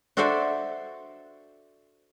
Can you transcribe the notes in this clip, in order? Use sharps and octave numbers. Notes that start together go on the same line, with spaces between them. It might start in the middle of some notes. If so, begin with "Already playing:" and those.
D4 F#4 A4 C5 D5 E5